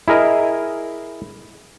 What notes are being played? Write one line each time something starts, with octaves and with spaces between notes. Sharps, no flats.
E4 G#4 A#4 D#5